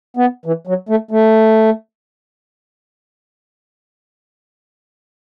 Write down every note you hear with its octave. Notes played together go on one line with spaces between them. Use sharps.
B3
E3
F#3
A3
A3